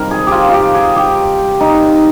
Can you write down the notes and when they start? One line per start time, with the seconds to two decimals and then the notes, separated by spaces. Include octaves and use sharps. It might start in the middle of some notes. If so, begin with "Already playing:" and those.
Already playing: C3 D#3 G3 F4 A#4
0.11 G#4
0.27 F4 G4
0.49 F4 G4
0.74 G#4
0.96 G4
1.60 D#4